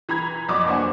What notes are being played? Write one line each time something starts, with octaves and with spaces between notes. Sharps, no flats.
E3 A#5 B5 G#6
F2 F#3 D5 D#5 C#6 D6
A#3 D4 C5 F#5 G#5